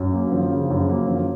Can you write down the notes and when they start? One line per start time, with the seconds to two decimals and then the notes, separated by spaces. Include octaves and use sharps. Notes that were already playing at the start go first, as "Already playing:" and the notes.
Already playing: F#2
0.13 A#3
0.32 F3
0.51 C#3
0.70 F#2
0.89 A#3
1.08 F3